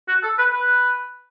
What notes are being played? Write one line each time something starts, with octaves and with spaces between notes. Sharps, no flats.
F#4
A4
B4
B4